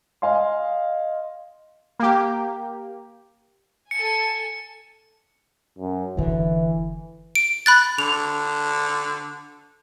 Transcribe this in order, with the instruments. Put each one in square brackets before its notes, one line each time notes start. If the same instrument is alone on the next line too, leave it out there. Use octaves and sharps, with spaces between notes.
[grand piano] D#5 F5 G#5 C6
[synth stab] A#3 G4
[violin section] A4 G#5 [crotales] C#7
[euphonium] F#2
[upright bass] F#1 D3 [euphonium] E3
[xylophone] D7
B5 F#6 A6
[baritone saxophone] D3 [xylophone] F7